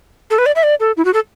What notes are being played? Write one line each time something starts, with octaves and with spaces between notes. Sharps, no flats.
A4
B4
D5
E5
D5
A4
E4
F#4
A4